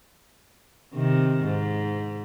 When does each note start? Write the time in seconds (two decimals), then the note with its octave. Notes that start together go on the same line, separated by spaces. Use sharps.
0.94 C3 D#3
1.44 G#2